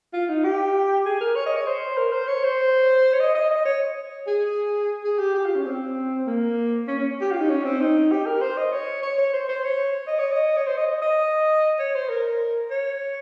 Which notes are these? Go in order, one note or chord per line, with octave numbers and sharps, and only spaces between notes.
F4
D#4
G4
G#4
A#4
C#5
D#5
C#5
C5
A#4
C5
C#5
C5
C#5
D#5
D#5
D#5
C#5
G#4
G#4
G4
G4
F4
C#4
C4
A#3
C#4
C#4
G4
F4
D#4
C#4
C4
D#4
G4
A#4
C5
D#5
C#5
C#5
C#5
C5
C5
C#5
D#5
C#5
D#5
C#5
C5
D#5
D#5
D#5
C#5
C5
A#4
C#5